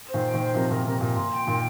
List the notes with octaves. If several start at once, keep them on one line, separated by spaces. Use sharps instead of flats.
C5
A#2 D#3
G5
A#2 D#3
C5
C3 F3 A#4
A#2 D#3 A#4
C3 A#4
A#2 A#4
A#2 C6
G5
A#2 D#3 A#4